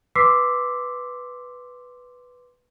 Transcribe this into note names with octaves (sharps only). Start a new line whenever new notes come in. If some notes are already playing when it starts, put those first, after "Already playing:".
B4 C6 D6 E6 B6 C7